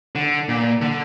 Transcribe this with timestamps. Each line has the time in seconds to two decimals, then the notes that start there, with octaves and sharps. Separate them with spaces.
0.15 D3
0.49 A#2
0.81 D3